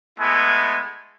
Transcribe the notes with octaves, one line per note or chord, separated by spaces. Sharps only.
G#3 A3 B3 E4 G#5